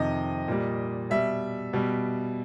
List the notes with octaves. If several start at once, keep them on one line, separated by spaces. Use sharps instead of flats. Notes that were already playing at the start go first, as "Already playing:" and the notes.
Already playing: F2 C3 D#3 D#5
A#2 G3
B2 G3 E5
B2 G3